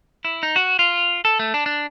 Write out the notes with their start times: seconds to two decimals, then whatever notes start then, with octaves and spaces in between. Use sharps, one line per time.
0.25 E4
0.43 D#4
0.56 F#4
0.79 F4
1.25 A4
1.39 A3
1.54 D4
1.66 D4